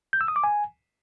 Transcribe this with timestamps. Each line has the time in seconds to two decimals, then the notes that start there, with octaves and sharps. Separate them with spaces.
0.13 G6
0.21 E6
0.28 D#6
0.36 D6
0.44 G#5